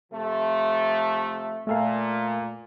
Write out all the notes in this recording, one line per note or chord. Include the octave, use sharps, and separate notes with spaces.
C3 F3 A3
A#2 A3 A4 F5